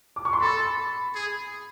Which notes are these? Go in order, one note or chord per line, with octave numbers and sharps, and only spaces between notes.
D6
C#6
C6
A4 B5
G#4